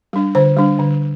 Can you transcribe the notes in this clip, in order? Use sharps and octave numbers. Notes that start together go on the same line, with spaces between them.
G3 D4
D3 C5
G3 D4
D3